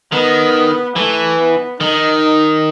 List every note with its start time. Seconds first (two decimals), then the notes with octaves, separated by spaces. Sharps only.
0.12 D#3 B3
0.96 E3 A3
1.38 B3
1.80 D#3 D#4